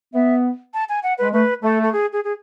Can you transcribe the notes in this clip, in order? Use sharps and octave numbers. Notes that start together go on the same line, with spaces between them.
B3 E5
A5
G#5
F#5
G#3 B4
A3 B4
A3 A4
A4
G#4
G#4
G#4